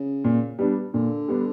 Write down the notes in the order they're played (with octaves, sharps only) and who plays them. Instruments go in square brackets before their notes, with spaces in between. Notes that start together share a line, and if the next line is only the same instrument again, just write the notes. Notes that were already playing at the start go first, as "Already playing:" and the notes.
Already playing: [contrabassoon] C#3
[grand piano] A#2
G3 B3 D4
[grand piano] A#2 [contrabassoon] D3
[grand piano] G3 B3 D4